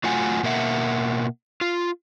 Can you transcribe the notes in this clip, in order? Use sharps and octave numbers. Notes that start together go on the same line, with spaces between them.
F#3 A3 F4 F#4 F#5 G#5
B2 A#3 A#4 E5 F#5
F4